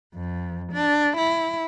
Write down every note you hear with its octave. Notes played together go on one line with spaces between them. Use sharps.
F2
D4
E4